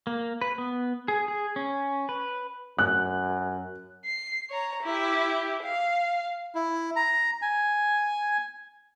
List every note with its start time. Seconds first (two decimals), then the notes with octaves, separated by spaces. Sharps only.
0.07 A#3
0.41 B4
0.58 B3
1.08 G#4
1.28 G#4
1.56 C#4
2.09 B4
2.79 F#2 F#6
4.05 C7
4.50 C#5 A#5
4.83 E4 G4
5.63 F5
6.55 E4
6.96 A#5
7.42 G#5